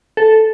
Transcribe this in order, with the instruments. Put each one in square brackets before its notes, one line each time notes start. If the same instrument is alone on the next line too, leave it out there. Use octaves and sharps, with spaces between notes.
[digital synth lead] A4